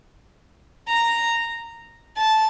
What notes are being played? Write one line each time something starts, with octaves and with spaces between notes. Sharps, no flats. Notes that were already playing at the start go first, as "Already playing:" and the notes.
A#5
A5